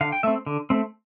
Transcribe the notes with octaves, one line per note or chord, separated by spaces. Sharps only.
D3 F5
G5
A3 C4 E5
D3
A3 C4